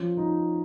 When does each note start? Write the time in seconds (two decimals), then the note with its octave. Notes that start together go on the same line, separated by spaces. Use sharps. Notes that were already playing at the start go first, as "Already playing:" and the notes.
Already playing: F3 C#4
0.17 D#4